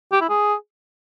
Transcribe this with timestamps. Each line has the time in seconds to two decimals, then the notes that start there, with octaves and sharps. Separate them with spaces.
0.12 G4
0.21 E4
0.29 G#4